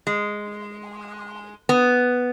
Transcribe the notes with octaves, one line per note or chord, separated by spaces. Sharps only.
G#3
B3